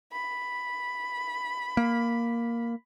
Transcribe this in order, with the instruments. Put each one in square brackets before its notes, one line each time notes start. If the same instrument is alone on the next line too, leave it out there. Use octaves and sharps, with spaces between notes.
[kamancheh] B5
[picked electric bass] A#3